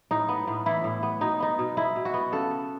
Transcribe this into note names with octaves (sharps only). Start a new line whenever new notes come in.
A2 D#4
B3
A2
E3 E4
A2
B3
B2 D#4
B3 D#4
B2
G#3 E4
B2
F#4
B3
C#3 A4
B3